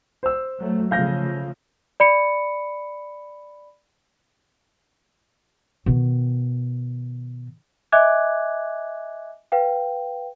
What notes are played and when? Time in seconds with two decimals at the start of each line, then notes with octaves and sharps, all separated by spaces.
0.23 C5 E6
0.59 F#3 A3
0.91 C#3 F3 A3 F5 G6 A#6
2.00 D5 B5 C#7
5.86 B2 D#3
7.92 D#5 E5 G#5 D6 F#6 G#6
9.52 B4 F5 G5